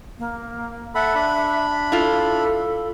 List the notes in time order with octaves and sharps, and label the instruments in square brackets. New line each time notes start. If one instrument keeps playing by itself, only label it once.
[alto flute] A#3
[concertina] A4 F#5 B5 [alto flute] E5
[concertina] D4 B5
[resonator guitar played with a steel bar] E4 F4 [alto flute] A4